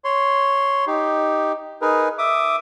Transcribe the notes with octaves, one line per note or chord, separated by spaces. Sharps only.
C#5 C6
D#4 G4
D#4 G#4 A#4 B4
E5 D6 D#6